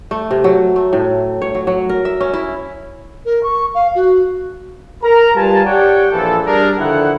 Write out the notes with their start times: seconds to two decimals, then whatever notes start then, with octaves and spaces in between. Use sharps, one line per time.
0.11 A3
0.31 C3
0.44 F#3
0.76 A3
0.93 A2
1.42 C#5
1.55 F#3
1.67 F#3
1.89 A#4
2.05 E5
2.21 C#4
2.34 E4
3.25 A#4
3.43 C#6
3.74 F5
3.94 F#4
5.03 A#4 A#5
5.36 G3 F4 B4 G#5 A5
5.65 G4 C#5 D5 F#5 G5
6.12 A#1 E3 F3 A4
6.46 G3 D4 G#4 A#4
6.79 D3 D#3 F3 E4 F#5